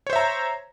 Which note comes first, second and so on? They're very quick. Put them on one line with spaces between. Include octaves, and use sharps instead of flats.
C#5 C5 E5 A#5